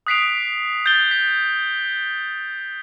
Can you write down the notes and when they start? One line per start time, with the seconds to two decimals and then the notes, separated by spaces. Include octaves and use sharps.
0.07 D#6 F#6 B6 C7 D7 F7
0.86 G6 A6 B6 G7
1.11 B6